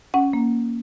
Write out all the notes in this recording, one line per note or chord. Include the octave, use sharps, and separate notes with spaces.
C#4 F#5
A#3